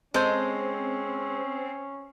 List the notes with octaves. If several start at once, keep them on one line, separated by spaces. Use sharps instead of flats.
G#3 C4 C#4 A4 C5